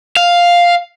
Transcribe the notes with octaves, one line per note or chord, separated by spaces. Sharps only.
F5